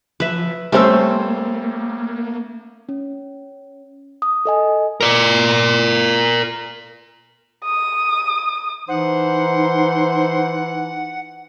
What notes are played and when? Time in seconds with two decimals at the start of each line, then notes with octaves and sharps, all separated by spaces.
0.20 F3 B4 E5
0.72 G3 A3 A#3 C4 C#4 C5 E6
2.89 C#4
4.22 D#6
4.45 A4 D#5 G#5
5.01 A#4 D5
7.65 D#6
8.89 E3 D#4 C5 F#5